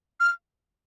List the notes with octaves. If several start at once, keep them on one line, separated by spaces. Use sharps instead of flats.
F6